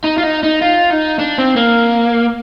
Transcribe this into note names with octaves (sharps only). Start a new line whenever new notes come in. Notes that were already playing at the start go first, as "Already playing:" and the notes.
D#4
F4
D#4
D#4
F4
D#4
D4
C4
A#3